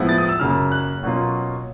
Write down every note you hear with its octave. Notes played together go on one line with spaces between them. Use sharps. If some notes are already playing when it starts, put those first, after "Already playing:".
Already playing: A2 F3 G#3 B3 E4
A6
D#6
E6
F#2 C#3 F#3 A#3 F6
F#6
B2 F#3 A#3 C#4 F4